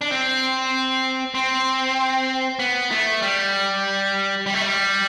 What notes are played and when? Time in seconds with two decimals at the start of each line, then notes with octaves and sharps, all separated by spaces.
0.01 D4
0.11 C4
1.35 C4
2.59 B3
2.91 A3
3.22 G3
4.46 G3
4.54 A3
4.62 G3